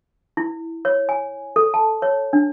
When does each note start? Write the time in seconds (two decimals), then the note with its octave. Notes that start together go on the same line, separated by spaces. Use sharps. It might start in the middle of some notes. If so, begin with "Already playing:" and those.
0.37 E4
0.85 C#5
1.09 G#5
1.56 A4
1.74 A5
2.02 C#5
2.33 D4